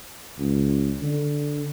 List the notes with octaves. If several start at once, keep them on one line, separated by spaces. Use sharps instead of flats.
C#2
D3